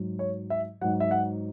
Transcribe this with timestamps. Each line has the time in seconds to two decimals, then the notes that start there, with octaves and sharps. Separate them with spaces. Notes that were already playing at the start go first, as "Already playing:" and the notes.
Already playing: G#2 F#3
0.19 C#5
0.50 E5
0.81 G#2 F#3 F#5
1.00 E5
1.11 F#5